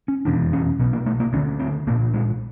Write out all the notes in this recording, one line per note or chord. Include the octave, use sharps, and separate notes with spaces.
C#4
F1 E2 B2 D4
C#4
B1 B2 B3
A#3
A3
A#3
D2 D3 C#4
C4
B1 A#2 A#3
G#3